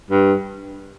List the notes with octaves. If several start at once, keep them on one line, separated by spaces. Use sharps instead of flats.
G2